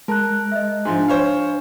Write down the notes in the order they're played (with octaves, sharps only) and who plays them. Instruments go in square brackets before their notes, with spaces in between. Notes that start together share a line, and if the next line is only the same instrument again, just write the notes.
[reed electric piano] G#3 F#6 [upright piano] A#4 [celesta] A5
[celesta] D#5 E5
[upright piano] G#2 F3 [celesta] D4 G#5
[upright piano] C5 C#5 F5